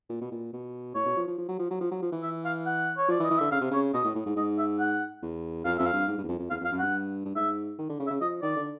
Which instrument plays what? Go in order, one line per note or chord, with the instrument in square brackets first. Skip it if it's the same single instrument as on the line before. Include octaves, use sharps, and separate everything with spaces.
[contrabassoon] A#2
B2
A#2
B2
[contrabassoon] A2 [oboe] C#5
[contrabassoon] B2
F3
F3
F3
F#3
F3
F#3
F3
F#3
F3
E3
[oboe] E5
F5
F#5
C#5
[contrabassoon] F3 [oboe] D5
[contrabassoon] E3
[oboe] D#5
[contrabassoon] E3
[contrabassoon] D3 [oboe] E5
[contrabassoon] C#3 [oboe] F5
[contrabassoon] C3
[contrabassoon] C#3 [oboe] C#5
[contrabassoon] B2 [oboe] D#5
[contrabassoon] A2
A2
G#2
[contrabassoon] G#2 [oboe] D#5
[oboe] E5
F#5
[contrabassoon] E2
[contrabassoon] F2 [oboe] F5
[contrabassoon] F2 [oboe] E5
[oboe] F5
[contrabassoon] G2
G#2
G2
E2
F2
F2
[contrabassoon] E2 [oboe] F5
[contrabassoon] F2 [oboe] F5
[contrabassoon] F#2
[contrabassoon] G2 [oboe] F#5
[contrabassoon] G2
[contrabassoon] G#2 [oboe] E5
[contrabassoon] D#3
D3
C#3
[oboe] E5
[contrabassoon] C#3
[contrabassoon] F3 [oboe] D#5
[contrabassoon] D#3 [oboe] D5
[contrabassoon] D3